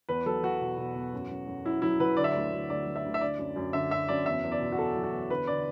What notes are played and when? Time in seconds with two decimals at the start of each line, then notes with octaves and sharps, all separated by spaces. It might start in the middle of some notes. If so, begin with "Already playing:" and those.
0.09 E2 B4
0.26 F#3 A4
0.43 F#3 F#4
0.61 B2
0.78 B2
0.95 E2
1.13 F#2
1.30 F#2
1.47 F#2
1.65 F#2 E4
1.82 F#3 E4
2.00 F#3 B4
2.17 D3 D5
2.24 E5
2.32 D2 D5
2.51 D2
2.70 D2 D5
2.87 F#3
2.96 E5
3.05 D2
3.14 E5
3.21 D3 D5
3.38 F#2
3.56 F#2
3.73 D3 E5
3.91 F#2 E5
4.08 F#2 D5
4.26 E2 E5
4.43 E2
4.52 D5
4.60 B2
4.72 F#4
4.78 B2 A4
4.96 F#3
5.04 F#4
5.12 E2
5.30 D3 B4
5.47 D3 D5